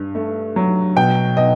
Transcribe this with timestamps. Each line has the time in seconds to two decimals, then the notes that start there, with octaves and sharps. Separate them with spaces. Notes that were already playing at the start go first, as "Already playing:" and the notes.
Already playing: G2
0.15 A3
0.56 F#3
0.96 B2 G5
1.37 B2 D#5